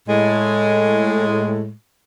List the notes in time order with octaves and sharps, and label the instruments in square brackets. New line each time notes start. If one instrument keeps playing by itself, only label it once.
[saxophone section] A2 G#3